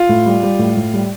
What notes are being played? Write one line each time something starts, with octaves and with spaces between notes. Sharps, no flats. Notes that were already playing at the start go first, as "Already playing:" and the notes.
Already playing: F4
A2
G3
G3
A2
A2
G3